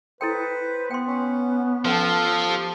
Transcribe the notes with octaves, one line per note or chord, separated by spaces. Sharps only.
E4 A4 B4 C5 G5
B3 G5 C6
C#4
F3 C#4 A4 B4 F5 A5 C6
G4